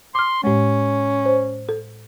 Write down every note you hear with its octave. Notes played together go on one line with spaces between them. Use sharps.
C6 D6 F6
A2 G#3 C#4
C5
A4